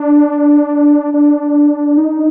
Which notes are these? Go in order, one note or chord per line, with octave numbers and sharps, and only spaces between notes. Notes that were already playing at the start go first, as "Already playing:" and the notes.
Already playing: D4
D4
D#4